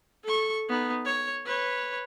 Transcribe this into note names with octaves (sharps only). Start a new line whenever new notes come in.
A4 C#6
B3 D#4
C#5
B4 C#5